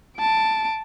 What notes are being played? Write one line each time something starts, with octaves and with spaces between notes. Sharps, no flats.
A5 D7